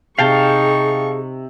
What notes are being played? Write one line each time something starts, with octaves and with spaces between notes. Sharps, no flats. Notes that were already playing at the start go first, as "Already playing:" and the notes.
C3 D#4 G#4 F5 G5 A5 C#6